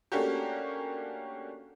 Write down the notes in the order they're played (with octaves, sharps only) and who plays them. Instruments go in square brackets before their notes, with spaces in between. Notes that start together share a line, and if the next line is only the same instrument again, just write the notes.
[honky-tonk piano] A3 A#3 C#4 D4 F#4 G4